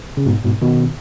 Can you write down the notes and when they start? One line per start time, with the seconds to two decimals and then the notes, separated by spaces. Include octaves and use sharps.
0.17 C#3
0.26 G#2 B2
0.44 G#2 B2
0.62 B2 D#3